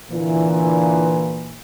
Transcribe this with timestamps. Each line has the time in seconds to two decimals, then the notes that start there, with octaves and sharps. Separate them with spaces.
0.12 A#2 D3 E3